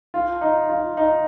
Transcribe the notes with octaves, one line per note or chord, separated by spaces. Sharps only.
F4
D#4
F4
D#4